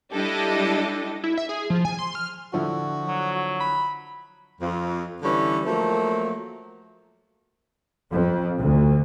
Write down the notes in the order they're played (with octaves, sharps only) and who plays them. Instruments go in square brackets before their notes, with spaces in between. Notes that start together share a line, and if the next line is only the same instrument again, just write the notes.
[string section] G3 D4 E4 G4 A4 D#5
[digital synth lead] E4
E5
G#4
F3
G#5
C6
F6
[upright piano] D3 F3 E4 [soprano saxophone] F#4
[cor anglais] F#3
[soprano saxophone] B5
[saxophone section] F2
D3 E3 G3 C#4
F3 F#3 A3 A#3
[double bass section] F2
D2